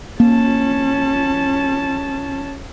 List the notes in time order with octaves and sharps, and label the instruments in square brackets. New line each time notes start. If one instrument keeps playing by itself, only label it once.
[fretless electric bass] A#3 [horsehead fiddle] C#4 A5